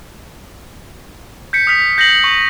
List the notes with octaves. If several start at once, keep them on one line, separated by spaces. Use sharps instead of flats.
G6 B6 C#7
D#6 F6 B6 F7
G6 A#6 C7 F#7
C#6